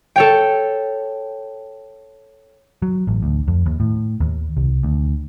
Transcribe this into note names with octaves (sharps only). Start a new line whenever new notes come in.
A4 C#5 G5
F#3
A1
D2
F2
D#2
A2
D#2
C2
D2